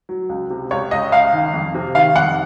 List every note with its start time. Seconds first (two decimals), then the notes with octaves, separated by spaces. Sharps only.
0.09 F#3
0.29 C#2
0.50 C3
0.71 C#2 C#5
0.91 C#2 D#5
1.12 C#2 F5
1.33 D#3
1.54 F2
1.74 C3
1.95 D#3 F5
2.16 F2 F#5